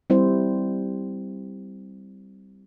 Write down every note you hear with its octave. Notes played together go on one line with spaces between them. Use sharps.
G3 C4 E4 C5